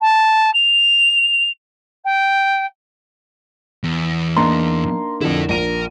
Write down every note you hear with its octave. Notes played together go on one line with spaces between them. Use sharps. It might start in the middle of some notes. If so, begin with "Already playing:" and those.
A5
F7
G5
E2
A#3 D4 D#4 A#5 C6
F2 D3 E4 A4
A#1 A#4 D#7